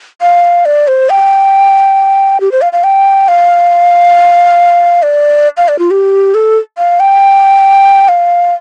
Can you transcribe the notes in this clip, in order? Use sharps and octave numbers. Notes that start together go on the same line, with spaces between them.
F5
D5
C5
G5
G4
C5
F5
F5
G5
F5
D5
F5
D5
F4
G4
A4
F5
G5
F5